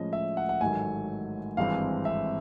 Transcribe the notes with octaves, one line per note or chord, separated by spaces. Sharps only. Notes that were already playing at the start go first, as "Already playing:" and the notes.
Already playing: A2 F3 G#3 C#4 D#5
E5
F#5
F#5
A1 G#2 D#3 F#3 A3 G#5
G#1 G2 E3 G#3 C4 F5
E5